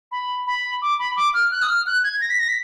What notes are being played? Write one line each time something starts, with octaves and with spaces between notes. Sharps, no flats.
B5
B5
D6
B5
D6
F6
F#6
D#6
F6
F#6
G#6
A#6
B6
A#6
B6